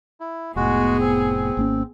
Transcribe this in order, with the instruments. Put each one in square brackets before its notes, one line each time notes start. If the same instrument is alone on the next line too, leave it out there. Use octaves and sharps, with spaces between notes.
[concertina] E4
[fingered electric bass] F1 A2 [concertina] G#3 F#4 [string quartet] B3 G#4
[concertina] C4
[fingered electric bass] G#1 A#3 C#4